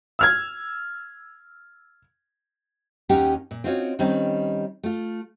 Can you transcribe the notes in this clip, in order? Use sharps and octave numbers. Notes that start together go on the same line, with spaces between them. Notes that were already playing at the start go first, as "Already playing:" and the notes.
E6 F6 G#6
D#2 C#4 D#4 G4 F#5 G5
A#2
C4 C#4 D#4 F4 F#4 C#5
D#3 G3 C4 C#4 D#4
A3 F4